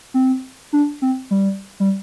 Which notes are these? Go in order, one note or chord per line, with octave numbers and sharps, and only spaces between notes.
C4
D4
C4
G3
G3